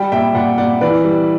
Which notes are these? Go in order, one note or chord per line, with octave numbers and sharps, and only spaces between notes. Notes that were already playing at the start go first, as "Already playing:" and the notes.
Already playing: G3 G5 B5
A#2 E5 G5
A#2 D5 F#5
A#2 D5 F#5
E3 B4 D5
G3